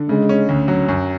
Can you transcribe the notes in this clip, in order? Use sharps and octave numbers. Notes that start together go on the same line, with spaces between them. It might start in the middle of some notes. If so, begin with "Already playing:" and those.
Already playing: D3
C#3 G#3
C#4
D2
F#3
F#2